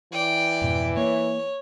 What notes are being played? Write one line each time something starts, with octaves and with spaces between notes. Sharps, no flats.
E3 D5 G5
F2 G#2 B2
A#3 C#5